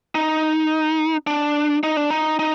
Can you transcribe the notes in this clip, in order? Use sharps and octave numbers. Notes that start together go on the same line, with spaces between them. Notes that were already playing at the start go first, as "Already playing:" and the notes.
D#4
D4
D#4
D4
D#4
D#4